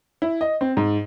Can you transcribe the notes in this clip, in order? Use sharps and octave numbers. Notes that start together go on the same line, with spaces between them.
E4
D#5
C4
G#2